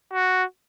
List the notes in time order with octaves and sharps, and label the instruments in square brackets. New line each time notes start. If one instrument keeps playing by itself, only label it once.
[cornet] F#4